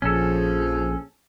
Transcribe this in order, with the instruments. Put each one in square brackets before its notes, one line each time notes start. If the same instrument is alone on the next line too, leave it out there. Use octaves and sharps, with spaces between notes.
[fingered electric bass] A#1 [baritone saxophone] F3 [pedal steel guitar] C#4 A4 [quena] G#4